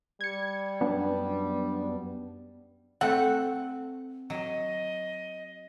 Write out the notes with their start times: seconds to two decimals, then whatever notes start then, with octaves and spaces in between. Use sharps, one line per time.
0.21 G3 G#6 C#7
0.81 F#2 B3 D4
3.01 A3 C4 F#5
4.30 F#3 D#5